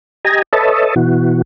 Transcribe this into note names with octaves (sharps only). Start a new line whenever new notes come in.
G4 D#5 G#5 A#5
A4 B4 C#5 D#5 E5 A5
B2 E3 F#4